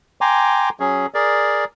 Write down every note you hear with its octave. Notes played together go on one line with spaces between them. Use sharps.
G5 G#5 A#5 C6 D6
F#3 C#4 G#4
G#4 A#4 D5